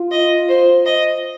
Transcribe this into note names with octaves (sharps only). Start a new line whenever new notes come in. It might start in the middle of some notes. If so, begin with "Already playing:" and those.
Already playing: F4
D#5
C5
D#5